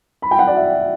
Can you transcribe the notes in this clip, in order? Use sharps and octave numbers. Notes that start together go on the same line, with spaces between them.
B5
G5
F#5
D5
E5